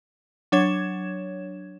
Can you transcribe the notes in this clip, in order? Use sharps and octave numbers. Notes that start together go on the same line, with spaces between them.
F#3 D4 C#5 G#6 E7